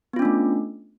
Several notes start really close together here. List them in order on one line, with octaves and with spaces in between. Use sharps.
B3 F4 C#4 D4 A3